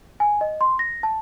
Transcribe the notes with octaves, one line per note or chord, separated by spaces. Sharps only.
G#5
D#5
C6
A#6
A5